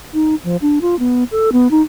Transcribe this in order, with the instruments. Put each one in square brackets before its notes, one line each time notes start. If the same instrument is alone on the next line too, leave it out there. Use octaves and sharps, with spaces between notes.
[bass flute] D#4
F3
D4
F4
B3
A4
B3
D#4